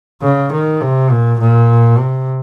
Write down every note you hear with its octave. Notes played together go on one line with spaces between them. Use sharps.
C#3
D#3
C3
A#2
A#2
C3